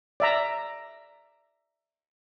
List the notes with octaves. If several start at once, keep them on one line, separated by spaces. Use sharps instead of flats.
D5 E5 A#5